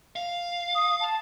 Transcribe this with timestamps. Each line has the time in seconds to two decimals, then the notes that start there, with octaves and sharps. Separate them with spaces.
0.16 F5
0.75 D#6
1.01 A5